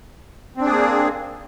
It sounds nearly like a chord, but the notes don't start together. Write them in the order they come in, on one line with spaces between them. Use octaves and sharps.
C4 D4 G#4 A#3